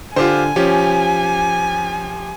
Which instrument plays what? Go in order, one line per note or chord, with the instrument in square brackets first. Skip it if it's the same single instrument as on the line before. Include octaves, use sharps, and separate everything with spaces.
[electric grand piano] D3 [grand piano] F4 G4 C5 [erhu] G#5
[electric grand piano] F3 G4 [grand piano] C#4